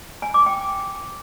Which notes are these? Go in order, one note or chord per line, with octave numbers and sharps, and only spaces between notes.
G#5
D6
G5